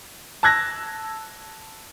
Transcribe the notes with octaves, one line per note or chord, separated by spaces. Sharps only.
A5 E6 F#6 G#6 A#6